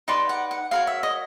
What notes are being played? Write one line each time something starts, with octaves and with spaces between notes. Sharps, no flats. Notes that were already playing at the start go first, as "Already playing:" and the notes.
D#4 G4 B4 D5 C6
F#5
F#5
F#4 A#4 C#5 F5
E5
D#5